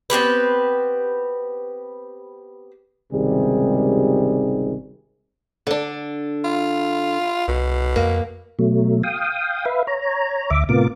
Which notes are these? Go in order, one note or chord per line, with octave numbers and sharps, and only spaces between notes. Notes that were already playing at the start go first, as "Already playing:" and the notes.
B3 C4 G4 B4
G#1 C#2 C3 D#3 G3 G#4
D3 D4
F4
C2 B2
F2 A#3
B2 F#3 A3
F5 G5 D#6
B4 E5 F5
C#5 A#5
D2 E5 D6
A2 C3 B3 F4 A#4 D6